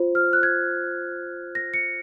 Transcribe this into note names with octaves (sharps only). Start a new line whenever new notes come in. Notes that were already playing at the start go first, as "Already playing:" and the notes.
Already playing: F4 C5
F6
F#6
G#6
A#6
C#7